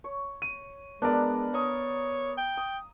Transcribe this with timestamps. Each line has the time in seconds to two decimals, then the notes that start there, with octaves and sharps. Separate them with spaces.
0.04 C#5
0.42 D#7
1.02 G#3 B3 D4 A#4 D5 A#5
1.53 C#5 A#5 D#6
2.38 G5
2.57 D#6